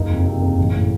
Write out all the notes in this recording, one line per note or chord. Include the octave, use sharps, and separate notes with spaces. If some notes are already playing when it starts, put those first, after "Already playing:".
Already playing: F#1 D#4
F2
C3
F#1
A1
A2